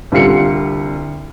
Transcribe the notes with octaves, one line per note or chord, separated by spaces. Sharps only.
C2 D3 F4 G4 C7 C#7